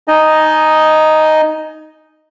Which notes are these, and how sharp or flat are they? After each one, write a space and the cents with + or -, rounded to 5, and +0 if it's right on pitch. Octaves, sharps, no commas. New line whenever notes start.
D#4 +0 D#5 +0 G#5 +30